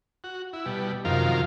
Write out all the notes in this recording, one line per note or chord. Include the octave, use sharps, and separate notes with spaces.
F#4
E4
B2 G3
F#2 C3 D#3 F3 A#4 F5